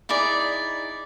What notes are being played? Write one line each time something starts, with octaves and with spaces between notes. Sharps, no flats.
D#4 E4 G#4 D5